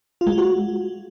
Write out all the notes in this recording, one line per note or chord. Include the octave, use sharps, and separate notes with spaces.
F4
G#3
F4
F#4